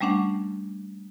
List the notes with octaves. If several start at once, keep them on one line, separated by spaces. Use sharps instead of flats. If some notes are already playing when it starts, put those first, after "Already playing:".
G3 A3 C#4 D4 F#5